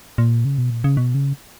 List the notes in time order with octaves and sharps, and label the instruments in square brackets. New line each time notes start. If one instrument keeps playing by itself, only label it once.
[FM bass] A#2
C#3
B2
A#2
C#3
B2
C#3